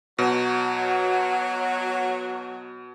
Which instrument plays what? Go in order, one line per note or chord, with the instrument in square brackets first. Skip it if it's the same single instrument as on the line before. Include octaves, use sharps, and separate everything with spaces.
[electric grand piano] B2 [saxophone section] F#3